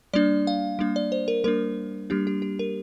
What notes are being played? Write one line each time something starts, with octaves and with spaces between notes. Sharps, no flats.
G3 A#3 D4 D5
F5
G3 A#3 D4
D5
C5
A#4
G3 A#3 D4 A#4
G3 A#3 D4 G4
G4
G4
A#4